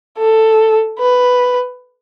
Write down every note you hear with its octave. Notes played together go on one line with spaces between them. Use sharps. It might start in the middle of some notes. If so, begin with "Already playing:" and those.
A4
B4